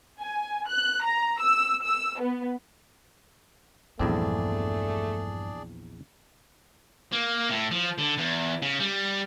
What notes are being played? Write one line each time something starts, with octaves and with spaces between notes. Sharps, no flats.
G#5
F#6
A#5
E6
E6
B3
A#1 E2 G2 A3 C4 D4 G#4 D5
A#3
A2
F3
D3
E2
C#3
G3